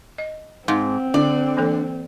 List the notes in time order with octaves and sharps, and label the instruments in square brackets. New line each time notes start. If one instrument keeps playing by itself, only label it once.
[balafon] D#5
[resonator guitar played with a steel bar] G#2 [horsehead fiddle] C4 [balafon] F5 C6
[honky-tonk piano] D3 [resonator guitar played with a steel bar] D5
[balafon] E3 A#3 A4